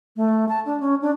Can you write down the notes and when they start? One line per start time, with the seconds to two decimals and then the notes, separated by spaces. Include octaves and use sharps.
0.16 A3
0.49 A5
0.66 D4
0.80 C#4
1.02 D4